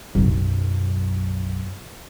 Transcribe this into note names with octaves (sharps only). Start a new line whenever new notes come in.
B1 F#2